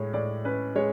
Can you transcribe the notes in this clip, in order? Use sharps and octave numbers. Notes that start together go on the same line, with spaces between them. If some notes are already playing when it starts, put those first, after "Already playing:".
Already playing: A2 G#3 C#5
A2 D5
C#4 B4
G#3 C#5